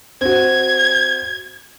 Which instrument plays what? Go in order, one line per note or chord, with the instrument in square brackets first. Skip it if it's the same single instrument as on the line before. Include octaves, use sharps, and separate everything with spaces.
[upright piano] C4 F#4 [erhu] G#6